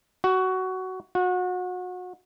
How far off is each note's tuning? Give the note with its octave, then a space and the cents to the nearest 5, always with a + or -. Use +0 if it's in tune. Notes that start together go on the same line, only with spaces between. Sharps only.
F#4 +15
F#4 -30